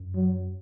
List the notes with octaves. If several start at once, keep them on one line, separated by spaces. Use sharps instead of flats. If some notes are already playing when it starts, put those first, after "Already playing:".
Already playing: F#2
F#3